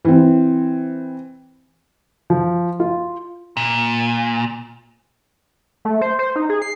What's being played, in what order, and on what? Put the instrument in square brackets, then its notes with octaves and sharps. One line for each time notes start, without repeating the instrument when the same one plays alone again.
[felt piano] E3 C4
[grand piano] F3
F4
[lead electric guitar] A#2
[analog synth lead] A3
C5
C5
D#4
G#4
C7